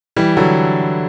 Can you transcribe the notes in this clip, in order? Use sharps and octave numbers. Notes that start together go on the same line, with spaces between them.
E3 G3
D3 F#3